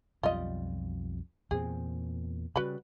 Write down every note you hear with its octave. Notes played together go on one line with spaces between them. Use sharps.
B1 F2 G3 F4 D#5
E2 A#2 C4 G#4
C#3 G3 F#4 B4 B5